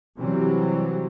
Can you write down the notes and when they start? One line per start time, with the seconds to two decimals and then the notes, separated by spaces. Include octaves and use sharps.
0.20 C3 E3 F#3 G3 C4